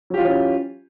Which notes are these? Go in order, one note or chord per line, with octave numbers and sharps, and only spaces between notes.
E3 F#3 C#4 F4 G4